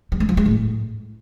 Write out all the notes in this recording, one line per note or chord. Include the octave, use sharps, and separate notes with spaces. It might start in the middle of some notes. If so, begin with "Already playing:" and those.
G3
G#3
F3
G#3
A2